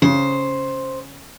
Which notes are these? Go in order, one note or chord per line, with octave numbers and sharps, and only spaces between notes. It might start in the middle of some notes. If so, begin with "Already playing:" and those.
C#3 C5